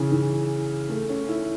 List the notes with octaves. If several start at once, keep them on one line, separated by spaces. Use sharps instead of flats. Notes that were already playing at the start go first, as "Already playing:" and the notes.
Already playing: C#3 E3
E3
A3
C#4
E4